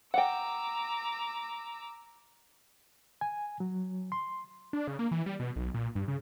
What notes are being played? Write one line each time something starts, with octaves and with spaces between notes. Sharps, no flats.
F#5 G5 A#5 D6 E6
G#5
F#3
C6
D4
C#3
A#3
E3
G3
B2
B1
A#2
G2
C#3